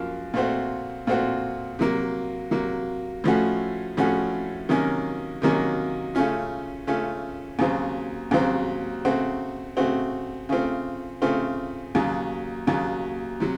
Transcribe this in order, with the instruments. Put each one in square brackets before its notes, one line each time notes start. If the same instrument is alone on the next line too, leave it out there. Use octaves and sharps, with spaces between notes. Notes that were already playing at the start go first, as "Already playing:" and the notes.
Already playing: [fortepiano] F#2 F3 A#3 F4
A#2 A3 C4 F#4
A#2 A3 C4 F#4
C3 F#3 A#3
C3 F#3 A#3
A2 F3 A3 C#4 F#4
A2 F3 A3 C#4 F#4
C3 D#3 F#3 A#3 C#4
C3 D#3 F#3 A#3 C#4
C#3 A3 C#4 F4
C#3 A3 C#4 F4
D#2 C#3 F#3 C4
D#2 C#3 F#3 C4
C#3 A3 C4 F#4
C#3 A3 C4 F#4
C#3 A3 C4 F4
C#3 A3 C4 F4
D#2 C#3 F#3
D#2 C#3 F#3
C3 F#3